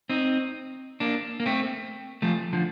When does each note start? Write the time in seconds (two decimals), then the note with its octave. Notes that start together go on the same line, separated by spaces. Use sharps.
0.10 C4 D#4
1.00 A#3 D4
1.40 A#3
1.46 A3 C4
2.22 F3 A3
2.53 D3 F3